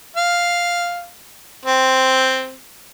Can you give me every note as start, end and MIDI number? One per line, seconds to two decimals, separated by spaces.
0.16 1.07 77
1.65 2.54 60